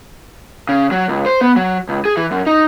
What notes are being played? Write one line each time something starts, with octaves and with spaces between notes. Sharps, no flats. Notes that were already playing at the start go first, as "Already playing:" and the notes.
C#3
F#3
C#2
C5
B3
F#3
C#2
G#4
E3
F#2
D#4